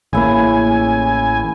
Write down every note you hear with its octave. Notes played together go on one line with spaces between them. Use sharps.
A1 C#3 A#3 E4 G#5